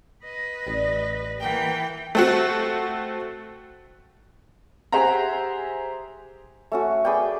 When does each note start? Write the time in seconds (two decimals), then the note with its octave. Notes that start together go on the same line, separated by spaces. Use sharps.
0.24 B4 D#5
0.67 A1 G3
1.41 D#3 E3 A#3 B3 G5
2.15 A3 C4 F#4
4.92 G4 G#4 C5 E5 F#5 A#5
6.72 A3 C#4 F#4
7.05 G#4 B4 D5 G5